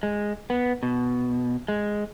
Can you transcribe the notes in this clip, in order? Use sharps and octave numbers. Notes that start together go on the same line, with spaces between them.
G#3
B3
B2
G#3